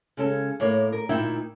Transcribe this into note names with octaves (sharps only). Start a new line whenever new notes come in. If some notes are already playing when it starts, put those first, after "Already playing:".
C#3 G#3 C#4 A4
A2 A#3 C#5 D5
A#4
D2 A#2 D#4 E4 E5 G5